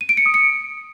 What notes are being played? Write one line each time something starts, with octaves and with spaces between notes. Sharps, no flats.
D#7
D7
C#7
D#6
C#7